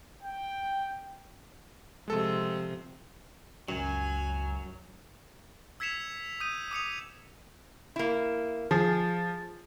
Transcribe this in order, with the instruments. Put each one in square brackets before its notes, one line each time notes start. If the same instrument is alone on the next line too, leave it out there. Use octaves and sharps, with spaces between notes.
[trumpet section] G5
[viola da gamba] C3 F3 [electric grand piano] G#3 A4
[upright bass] C#2 [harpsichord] F#2 [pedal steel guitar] F#3 [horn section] G#5
[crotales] E6 G#6 B6 C#7 E7 F7
D#6 G6 D#7
D6 D#6 C#7 F7
[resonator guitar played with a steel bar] A#3 E4
[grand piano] F3 [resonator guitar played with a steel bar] G#4